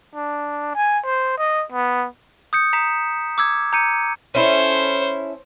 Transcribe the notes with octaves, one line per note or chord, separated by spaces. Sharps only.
D4
G#5
C5
D#5
B3
D#6 G6 C#7
A#5 B6 E7
D6 E6 G#6
A#5 G6 C#7 D#7
C#4 E4 A4 C5 C#5